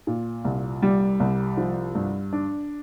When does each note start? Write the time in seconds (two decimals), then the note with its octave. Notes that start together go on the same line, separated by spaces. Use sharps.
0.07 A#2
0.45 C2
0.82 G3
1.20 C2
1.57 F3
1.95 G2
2.33 D4